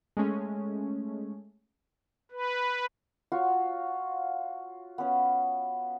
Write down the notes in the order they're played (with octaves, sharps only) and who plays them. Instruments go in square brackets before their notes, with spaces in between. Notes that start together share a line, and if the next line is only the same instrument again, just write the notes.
[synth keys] G#3 A3 C#4
[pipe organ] B4
[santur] F4 F#4 C#5 C#6
B3 C#4 B4